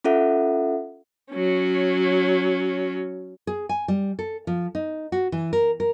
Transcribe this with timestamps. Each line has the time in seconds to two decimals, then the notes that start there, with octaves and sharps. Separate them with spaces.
0.04 C#4 F4 A4 E5 F#5
1.33 F#3 C#4
3.47 G#4
3.69 G#5
3.88 G3
4.19 A4
4.47 F3
4.75 D#4
5.12 F#4
5.32 E3
5.53 A#4
5.80 A#4